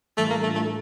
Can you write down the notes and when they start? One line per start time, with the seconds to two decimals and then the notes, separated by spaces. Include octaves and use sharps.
0.18 A2 E3 G3 A3 D4 F4
0.30 A#3
0.43 A3
0.54 A3